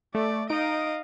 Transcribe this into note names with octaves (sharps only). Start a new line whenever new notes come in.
A3 D5
D#4 D#5 F5 D7